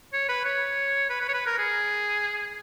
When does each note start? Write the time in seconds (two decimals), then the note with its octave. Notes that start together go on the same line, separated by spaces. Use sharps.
0.13 C#5
0.29 B4
0.45 C#5
1.10 B4
1.21 B4
1.28 C#5
1.34 B4
1.46 A#4
1.58 G#4